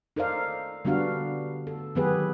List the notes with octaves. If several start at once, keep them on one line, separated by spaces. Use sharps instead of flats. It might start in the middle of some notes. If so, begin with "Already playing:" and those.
D#4 A4 A#4 C5 D5 F5
D3 G3 B3 D4 F#4 F5
A4
D#3 F#3 B3 G4 G#4 B4